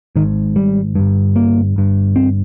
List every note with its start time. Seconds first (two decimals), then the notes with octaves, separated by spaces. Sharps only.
0.16 G#1 G#2 D#3
0.56 G3
0.95 G1 G2
1.36 A#3
1.76 G1 G2
2.16 C4